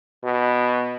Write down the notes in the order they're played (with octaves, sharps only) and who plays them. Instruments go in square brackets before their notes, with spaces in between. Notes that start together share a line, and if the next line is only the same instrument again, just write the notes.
[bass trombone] B2